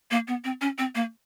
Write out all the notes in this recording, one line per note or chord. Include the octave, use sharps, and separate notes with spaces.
A#3
B3
C4
C#4
C4
A#3